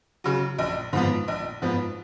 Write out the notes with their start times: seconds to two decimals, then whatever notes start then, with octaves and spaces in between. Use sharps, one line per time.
0.24 C#3 F#3
0.58 A#1
0.93 G#2 F3 B3
1.28 A#1
1.62 G#2 F3 B3